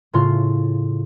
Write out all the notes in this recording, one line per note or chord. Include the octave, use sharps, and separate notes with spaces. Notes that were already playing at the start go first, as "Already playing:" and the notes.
A2 C#3 F4 C6